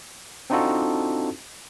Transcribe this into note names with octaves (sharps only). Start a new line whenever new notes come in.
C4 D4 D#4 F4 F#4 A4